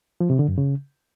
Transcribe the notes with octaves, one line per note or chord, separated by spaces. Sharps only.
F3
C3
D3
F#2
C#3